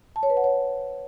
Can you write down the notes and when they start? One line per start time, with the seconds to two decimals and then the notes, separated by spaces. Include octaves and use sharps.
0.16 A5
0.23 C#5
0.30 B4
0.37 F#5
0.44 C#5